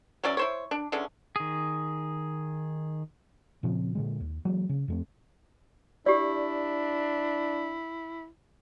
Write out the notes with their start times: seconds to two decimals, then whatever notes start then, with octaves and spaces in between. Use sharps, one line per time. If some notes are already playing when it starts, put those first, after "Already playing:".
0.23 E3 F#3 C#4 D5
0.37 E4 C5 C#5
0.71 D4
0.92 D3 E3 G#3 C#4
1.36 D#3 G#4
3.63 A#2 C#3 F3 C4
3.95 A#2 D3 G#3
4.20 D#2
4.45 E3 F#3 G#3 A#3
4.69 C#3
4.88 F2 A3 C4
6.06 D4 E4 G4 D5